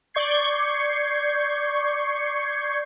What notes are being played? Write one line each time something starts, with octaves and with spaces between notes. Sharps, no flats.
D5 C#6 G6 G#6 C7